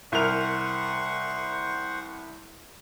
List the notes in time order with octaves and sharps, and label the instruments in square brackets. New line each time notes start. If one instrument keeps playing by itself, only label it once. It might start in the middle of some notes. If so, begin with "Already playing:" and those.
[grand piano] C2 A#4 F7 [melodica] C5 F#5 C#6